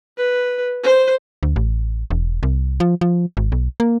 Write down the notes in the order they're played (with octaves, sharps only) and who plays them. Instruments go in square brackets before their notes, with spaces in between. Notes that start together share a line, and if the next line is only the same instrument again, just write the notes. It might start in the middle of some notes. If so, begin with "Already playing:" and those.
[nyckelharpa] B4
C5
[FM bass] D2
A1
E1
C2
F3
F3
G#1
B1
A#3